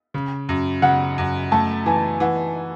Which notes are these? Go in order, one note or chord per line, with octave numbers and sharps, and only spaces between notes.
C#3
F#2
C#3 F#5
F#2
A3 A5
E3 G#5
E3 F#5